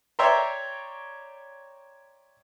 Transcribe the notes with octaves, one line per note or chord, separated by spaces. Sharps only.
C#5 D5 E5 G5 A#5 C6